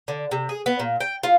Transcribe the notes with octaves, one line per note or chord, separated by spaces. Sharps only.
D3
C3
G#4
B3
A#2
G5
F4